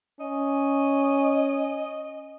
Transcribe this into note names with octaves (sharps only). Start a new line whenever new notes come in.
C#4 D#5